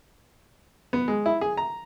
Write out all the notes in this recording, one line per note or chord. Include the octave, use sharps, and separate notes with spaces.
B3
G#3
E4
G#4
A#5